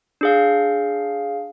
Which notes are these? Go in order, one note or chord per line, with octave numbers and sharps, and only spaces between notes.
D4 G#4 F5